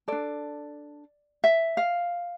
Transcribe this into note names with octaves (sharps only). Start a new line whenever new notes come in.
D4 A4 D5
E5
F5